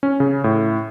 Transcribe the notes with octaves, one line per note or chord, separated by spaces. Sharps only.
C#4
C#3
A2